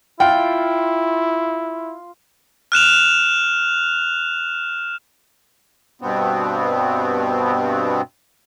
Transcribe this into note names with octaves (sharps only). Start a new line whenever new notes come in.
E4 F4 G5
F6 F#6 E7 F7
G2 B2 B3 C4